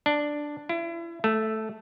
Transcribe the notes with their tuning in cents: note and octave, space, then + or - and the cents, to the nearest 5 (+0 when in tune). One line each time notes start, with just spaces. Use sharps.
D4 +5
E4 +35
A3 -5